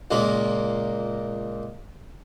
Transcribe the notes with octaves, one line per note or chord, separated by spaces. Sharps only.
C#2 A#2 A#3